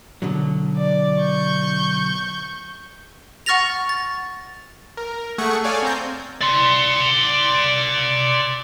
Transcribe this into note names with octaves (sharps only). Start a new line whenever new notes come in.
B2 D3 F#3
D5
C#6 G6
F#5 C#6 F6 A6 A#6 F7
A6
A#4
A3 G#4 F#5 C#6
A4 C#5 D5 F5 G#5
C4 A#5 G6
D5 C6